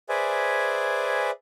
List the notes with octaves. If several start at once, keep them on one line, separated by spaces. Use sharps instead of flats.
G#4 B4 C5 D5 E5 G#5